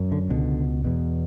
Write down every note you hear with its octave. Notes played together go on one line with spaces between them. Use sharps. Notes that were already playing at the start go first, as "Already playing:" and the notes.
Already playing: F#2
D3
C#2 B2 D3
E2 B2